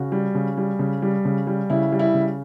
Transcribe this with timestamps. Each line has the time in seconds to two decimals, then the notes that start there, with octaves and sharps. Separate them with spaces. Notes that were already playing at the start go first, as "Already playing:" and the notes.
Already playing: C#3 F#4
0.12 G3
0.35 C#3
0.57 G3
0.79 C#3
1.02 G3
1.25 C#3
1.47 G3
1.70 C#3 E4
1.92 G3
1.99 E4
2.14 C#3